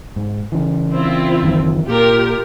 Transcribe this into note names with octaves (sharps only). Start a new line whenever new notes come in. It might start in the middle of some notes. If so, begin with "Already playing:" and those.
G#2
C#3 E3
C4 E4 F4
F#1 D#3 E3
A#2 F4 G4 A#4